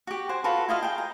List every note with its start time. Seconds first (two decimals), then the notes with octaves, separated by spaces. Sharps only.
0.07 F#4 G4
0.29 C5 F#5 G#5
0.44 F4 F#4 A4 B4
0.68 E4 F4 D#5 F5
0.82 G#4 G5
0.98 A#5